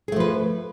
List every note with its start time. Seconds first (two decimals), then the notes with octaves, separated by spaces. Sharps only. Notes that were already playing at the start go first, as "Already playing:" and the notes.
0.08 G#4
0.12 A3
0.16 F3
0.20 B4